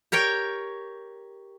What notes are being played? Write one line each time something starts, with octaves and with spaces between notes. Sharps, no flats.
G4 A#4 C#5 G5